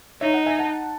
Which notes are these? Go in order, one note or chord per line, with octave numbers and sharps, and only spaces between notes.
D#4 C#5 E5
D#5 F#5
E5 G#5
F#5 A5